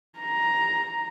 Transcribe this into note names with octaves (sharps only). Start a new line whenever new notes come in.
A#5